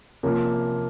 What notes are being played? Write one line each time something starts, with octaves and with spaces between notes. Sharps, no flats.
C3 F3 A#3 C#4